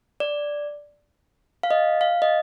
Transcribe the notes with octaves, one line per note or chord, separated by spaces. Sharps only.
D5
F5
D#5
F5
D#5